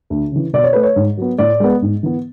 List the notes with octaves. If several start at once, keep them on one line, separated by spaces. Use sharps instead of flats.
D2
C#3 E3
B2 D5
C#5
A3 B4
C#5
G#2
F#3 B3
A2 D5
G#3 B3
G#2
E3 B3